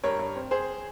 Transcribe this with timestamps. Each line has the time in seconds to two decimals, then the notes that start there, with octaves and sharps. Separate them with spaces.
0.04 G2 A#4 C#5
0.19 G2
0.35 C4
0.51 C4 G#4 C5